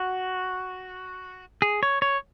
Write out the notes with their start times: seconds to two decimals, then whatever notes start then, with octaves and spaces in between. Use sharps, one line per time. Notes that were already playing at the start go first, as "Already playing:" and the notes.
Already playing: F#4
1.62 G#4
1.83 C#5
2.02 C#5